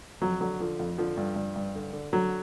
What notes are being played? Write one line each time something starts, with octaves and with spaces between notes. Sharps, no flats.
F2 F#3
D3 F#3
D3 F3
F2
D3 F3
G2
G2
G2
D3
D3
D3 F#3